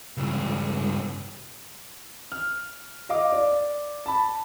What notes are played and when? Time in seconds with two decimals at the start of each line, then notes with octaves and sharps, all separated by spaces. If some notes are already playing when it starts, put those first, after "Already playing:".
0.17 C#2 G2
2.32 F6
3.09 D#5 F5 D6
3.32 D5
4.06 A5 B5